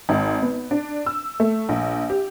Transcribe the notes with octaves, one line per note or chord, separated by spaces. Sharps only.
G#1
B3
D4
E6
A3
A#1
G4